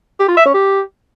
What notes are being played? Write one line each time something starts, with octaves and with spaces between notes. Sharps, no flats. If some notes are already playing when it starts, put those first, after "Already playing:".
G4
F4
E5
C#4
G4